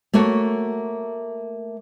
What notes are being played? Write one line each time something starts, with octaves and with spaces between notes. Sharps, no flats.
A3 A#3 F#4 C#5